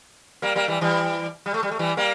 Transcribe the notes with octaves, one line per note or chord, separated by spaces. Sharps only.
G3 A#3
G3 A#3
E3 G3
E3 G3
G3
A3
G3
A3
E3 G3
G3 A#3